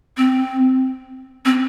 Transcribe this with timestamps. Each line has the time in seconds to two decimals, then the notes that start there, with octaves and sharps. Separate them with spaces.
0.17 C4
1.45 C4